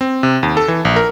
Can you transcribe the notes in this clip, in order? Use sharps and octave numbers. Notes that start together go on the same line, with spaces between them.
C4
C3
D#2
A4
E3
A#1
A#4